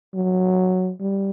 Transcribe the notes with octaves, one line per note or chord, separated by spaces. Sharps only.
F#3
G3